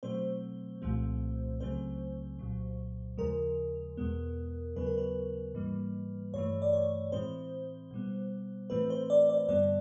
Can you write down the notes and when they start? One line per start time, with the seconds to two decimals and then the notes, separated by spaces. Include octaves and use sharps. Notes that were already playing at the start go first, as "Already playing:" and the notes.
0.03 B2 F#3 A3 C4 C5
0.82 C2 A#2 F3 A3 C4
1.60 C#2 C#3 F#3 A3 C4 C5
2.39 C2 A#2 F#3
3.18 D#2 C#3 F3 G#3 A#4
3.97 E2 B2 G#3 B3
4.76 D#2 C#3 F#3 B3 B4
4.86 A#4
4.98 B4
5.54 G#2 E3 G3 A#3
6.34 G2 E3 A3 C#5
6.62 D5
6.73 C#5
7.12 A2 E3 G#3 C4 C5
7.91 B2 G3 B3
8.70 A2 E3 A3 C4 B4
8.90 C5
9.10 D5
9.29 D5
9.49 G2 D3 G3 B3 D5